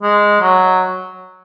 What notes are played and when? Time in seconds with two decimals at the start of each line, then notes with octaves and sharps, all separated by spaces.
0.03 G#3
0.41 F#3